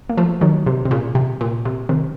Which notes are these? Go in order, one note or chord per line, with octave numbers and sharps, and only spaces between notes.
A#3
F3 A3
D#3 F#3
C3
C3
A#2 C#3
C3
A#2
C3
C3 D#3